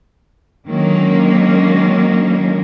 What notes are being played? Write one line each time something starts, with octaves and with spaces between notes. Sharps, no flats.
D3 D#3 F#3 G#3 A#3 C#4